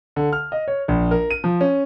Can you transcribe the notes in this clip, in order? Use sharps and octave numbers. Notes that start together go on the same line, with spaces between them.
D3
F6
D#5
C#5
A#1
A#4
D#7
F3
C#4